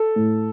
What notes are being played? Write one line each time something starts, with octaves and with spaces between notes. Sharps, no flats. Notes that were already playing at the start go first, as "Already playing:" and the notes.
Already playing: A4
A2